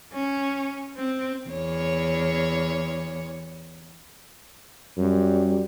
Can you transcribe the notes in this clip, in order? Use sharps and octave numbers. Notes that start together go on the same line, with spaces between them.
C#4
C4
E2 C#5
F#2 G3